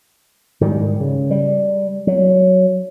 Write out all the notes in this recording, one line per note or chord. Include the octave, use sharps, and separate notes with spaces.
G#2 D#3 G3
C#3
G3
F#3